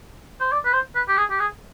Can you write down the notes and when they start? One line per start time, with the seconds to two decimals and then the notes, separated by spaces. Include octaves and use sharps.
0.41 C5
0.52 D5
0.65 B4
0.73 C5
0.95 B4
1.08 G4
1.18 G#4
1.31 G4
1.40 G#4